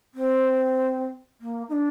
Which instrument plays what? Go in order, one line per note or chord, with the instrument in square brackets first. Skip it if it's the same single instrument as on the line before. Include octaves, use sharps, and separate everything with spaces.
[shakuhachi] C4
A#3
D#4
D4